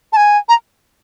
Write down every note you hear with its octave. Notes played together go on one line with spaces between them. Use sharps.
A5
G#5
A#5